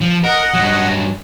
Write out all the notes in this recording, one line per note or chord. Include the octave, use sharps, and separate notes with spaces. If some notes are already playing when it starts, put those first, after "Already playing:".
F3
A#4 D#5 F#5
G2 F#3